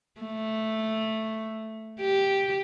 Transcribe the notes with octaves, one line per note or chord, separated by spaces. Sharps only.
A3
G4